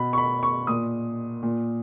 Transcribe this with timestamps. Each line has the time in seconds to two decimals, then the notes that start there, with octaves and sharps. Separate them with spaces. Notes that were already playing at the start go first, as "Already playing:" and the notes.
Already playing: B2 B5
0.13 C#6
0.18 B5
0.43 C#6
0.67 A#2 D#6
1.43 A#2